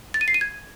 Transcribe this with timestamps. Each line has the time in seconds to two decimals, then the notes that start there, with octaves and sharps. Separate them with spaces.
0.14 A6
0.21 D#7
0.28 C7
0.34 D#7
0.41 G#6